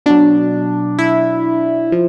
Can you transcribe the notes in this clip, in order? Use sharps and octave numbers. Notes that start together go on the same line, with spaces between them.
B2 F#3 D4
E4
F3